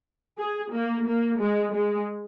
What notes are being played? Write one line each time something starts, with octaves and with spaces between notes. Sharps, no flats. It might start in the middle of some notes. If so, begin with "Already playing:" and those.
G#4
A#3
A#3
G#3
G#3